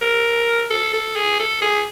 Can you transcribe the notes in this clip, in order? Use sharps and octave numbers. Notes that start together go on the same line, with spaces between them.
A#4
A4
A4
G#4
A4
G#4